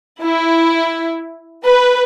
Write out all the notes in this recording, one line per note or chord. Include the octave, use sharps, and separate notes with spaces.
E4
B4